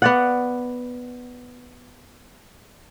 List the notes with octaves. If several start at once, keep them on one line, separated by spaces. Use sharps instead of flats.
B3 D5 F#5